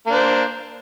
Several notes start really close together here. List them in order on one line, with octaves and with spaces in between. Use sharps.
A#3 D4 C5